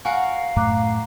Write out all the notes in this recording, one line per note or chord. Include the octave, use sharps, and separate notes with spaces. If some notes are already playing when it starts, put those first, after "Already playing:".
F#4 A#4 F5 F#5 G#5
F#2 A2 A3 A#5 D6 F#6